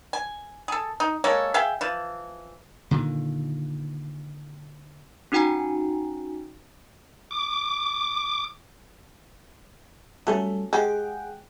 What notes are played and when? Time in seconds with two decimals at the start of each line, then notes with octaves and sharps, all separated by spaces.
0.13 G#5
0.68 G#4 A4
1.00 D#4
1.24 G#3 A#3 A4 C#5
1.54 G#4 E5 F5 G5
1.81 E3 F3
2.91 A#2 D3 D#3
5.32 C#4 D#4 F#4 G5 G#5 A#5
7.31 D6
10.27 F#3 G3 A3 C#4 A4
10.73 G#3 G4 G#4 F#5 G5